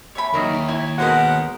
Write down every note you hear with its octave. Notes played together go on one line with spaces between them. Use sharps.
C#5 E5 B5
D#2 D#3 F#3 A#4
A#4
E4 C#5
B2 G#3 B3 A#4 C5 F#5